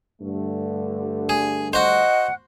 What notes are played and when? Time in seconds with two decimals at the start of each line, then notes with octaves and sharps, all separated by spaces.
0.21 G2 D3 A3
1.29 G#4
1.73 F#4 C5 D#5 F#5 F#6